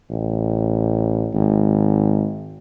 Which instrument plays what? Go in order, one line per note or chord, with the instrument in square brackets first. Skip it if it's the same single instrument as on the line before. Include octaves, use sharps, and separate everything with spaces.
[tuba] A1
G#1